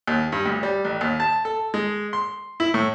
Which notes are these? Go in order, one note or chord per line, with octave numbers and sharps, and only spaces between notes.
D#2
G2
D2
G3
A1
D#2
A5
A4
G#3
C6
E4
A2